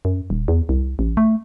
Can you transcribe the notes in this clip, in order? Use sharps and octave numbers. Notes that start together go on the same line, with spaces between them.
F#2
D#1
E2
C2
A1
A3